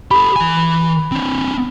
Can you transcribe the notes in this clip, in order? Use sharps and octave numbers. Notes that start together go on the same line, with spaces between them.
G4 A4 B5
E3 G#5
C4 D4